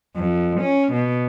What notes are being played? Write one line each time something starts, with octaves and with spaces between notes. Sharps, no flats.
F2
C#4
B2